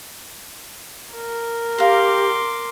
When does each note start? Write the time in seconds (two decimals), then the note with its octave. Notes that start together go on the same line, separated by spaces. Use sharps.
1.14 A#4
1.78 G4 F5 A#5 C6 D6